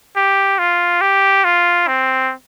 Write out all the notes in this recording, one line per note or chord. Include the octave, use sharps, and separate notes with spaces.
G4
F4
G4
F4
C4